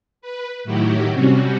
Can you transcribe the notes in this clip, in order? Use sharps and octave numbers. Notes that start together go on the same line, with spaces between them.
B4
A2 D#3 F#3 E4 F#4 G4
C3 G3 C4 C#4 F#4